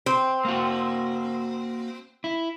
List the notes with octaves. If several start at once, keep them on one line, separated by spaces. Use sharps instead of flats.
C4
A#3 F#4
E4